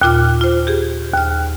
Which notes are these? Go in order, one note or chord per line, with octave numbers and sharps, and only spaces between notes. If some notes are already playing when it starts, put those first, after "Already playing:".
D#2 A#2 F4 D6 F6
F4 C5
G4 G#4
D#2 F6